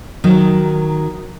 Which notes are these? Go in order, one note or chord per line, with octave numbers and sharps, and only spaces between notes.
D#3 F#3 D#4